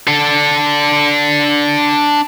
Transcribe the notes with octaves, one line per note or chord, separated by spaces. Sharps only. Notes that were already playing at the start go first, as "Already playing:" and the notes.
D4 A4